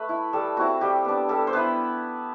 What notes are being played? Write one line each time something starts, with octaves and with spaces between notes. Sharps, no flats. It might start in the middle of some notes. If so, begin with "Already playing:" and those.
Already playing: A3 B4
E4
G3 A4
C4 E4 F#4
G3 G4
B3 D4
G3 A4
C5
B3 E4 B4